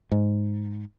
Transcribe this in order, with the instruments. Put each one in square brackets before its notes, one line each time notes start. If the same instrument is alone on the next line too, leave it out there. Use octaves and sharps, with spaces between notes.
[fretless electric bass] G#2